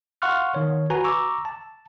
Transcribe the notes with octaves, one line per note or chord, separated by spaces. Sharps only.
F5 F#5 C6 C#6 F6 F#6
D#3 C#5
F#4 B4 G#5 A#5
A#5 C#6 D6 E6
A5